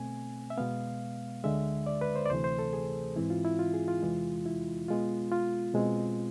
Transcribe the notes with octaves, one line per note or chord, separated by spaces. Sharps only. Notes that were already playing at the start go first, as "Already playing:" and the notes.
Already playing: B2 A3 C4 G#5
E5
B2 G#3 B3 F5
D2 D3 G#3 E5
D5
B4
C5
D5
D2 C3 E3 A3 C5
C5
A4
G#4
G#2 E3 G#3 C4 E4
F4
E4
F4
G#4
F4
E2 C3 E3 G#3
E4
B2 G#3 B3 F4
F4
B2 G#3 C4